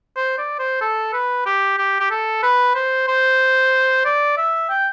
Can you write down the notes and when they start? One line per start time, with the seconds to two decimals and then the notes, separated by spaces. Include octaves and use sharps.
0.16 C5
0.38 D5
0.59 C5
0.81 A4
1.13 B4
1.46 G4
1.78 G4
2.00 G4
2.11 A4
2.43 B4
2.75 C5
3.08 C5
4.05 D5
4.37 E5
4.70 G5